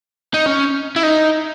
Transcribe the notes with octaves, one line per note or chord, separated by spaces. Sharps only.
D#4
C#4
E4
D#4